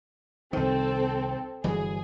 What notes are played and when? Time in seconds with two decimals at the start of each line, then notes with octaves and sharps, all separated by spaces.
0.53 C2 D#3 C4 A4
1.64 G1 E3 F#3 G#4